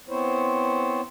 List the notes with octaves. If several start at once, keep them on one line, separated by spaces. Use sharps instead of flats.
B3 C4 E4 C5 C#5